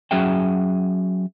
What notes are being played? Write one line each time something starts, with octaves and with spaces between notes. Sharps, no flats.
F#3 C#4 F#4 G#4 E5 G5